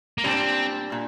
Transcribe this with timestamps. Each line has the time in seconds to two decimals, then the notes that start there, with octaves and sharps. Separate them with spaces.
0.18 A#3
0.24 A#2 G3 C4 D4
0.92 A#2